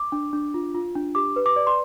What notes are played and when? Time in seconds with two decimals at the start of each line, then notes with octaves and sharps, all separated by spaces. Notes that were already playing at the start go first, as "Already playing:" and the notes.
Already playing: D6
0.12 D4
0.33 D4
0.54 F4
0.74 F4
0.95 D4
1.15 G4 D6
1.36 B4
1.46 D6
1.56 D5
1.67 C6